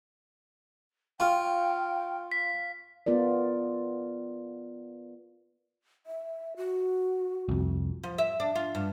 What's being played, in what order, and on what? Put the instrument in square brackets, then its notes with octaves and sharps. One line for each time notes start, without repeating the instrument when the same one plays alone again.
[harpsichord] F4 [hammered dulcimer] F5 C#6 [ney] G5
[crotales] B6
[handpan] B3 F4 A#4 D5
[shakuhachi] E5
F#4
[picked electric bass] C2 F2
[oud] F3
E5
D4
F4
G2